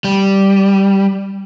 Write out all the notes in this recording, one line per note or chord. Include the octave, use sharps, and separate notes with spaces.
G3